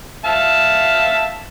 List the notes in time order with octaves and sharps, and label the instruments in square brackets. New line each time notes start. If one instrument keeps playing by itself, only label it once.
[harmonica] E5 F5 A5